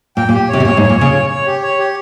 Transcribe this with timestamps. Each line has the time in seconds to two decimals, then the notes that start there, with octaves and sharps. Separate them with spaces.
0.17 A#2 G5
0.29 A#2
0.33 G4
0.49 C3 C#5
0.60 C3
0.65 A#2 C#5
0.77 G#2
0.81 C#5
0.90 A#2
0.98 C#3 C#5
1.14 C#5
1.30 C#5
1.46 G4
1.62 C#5
1.79 G4